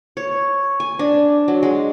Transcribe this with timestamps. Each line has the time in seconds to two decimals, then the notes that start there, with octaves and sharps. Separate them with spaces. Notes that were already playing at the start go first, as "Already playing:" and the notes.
0.17 C#5
0.80 G#5
0.99 D4
1.48 F#3
1.63 G#3